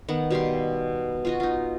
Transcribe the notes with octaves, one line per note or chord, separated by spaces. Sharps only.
D#3 B3 F#5
B2 G3 F5 C6
F4 F#4 D#5
D#4 F4